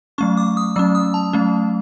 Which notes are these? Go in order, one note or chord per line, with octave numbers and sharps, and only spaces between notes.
F#3 A3 C#4 C#6
D6
D#6
F#3 A3 C#4 E6
D#6
A5
F#3 A3 C#4